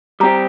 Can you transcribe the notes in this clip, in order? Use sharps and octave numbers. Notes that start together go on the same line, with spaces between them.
G3 C4 G4 A#5